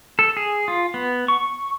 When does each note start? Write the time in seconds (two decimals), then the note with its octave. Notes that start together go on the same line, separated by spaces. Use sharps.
0.19 A4
0.37 G#4
0.68 F4
0.94 B3
1.28 C#6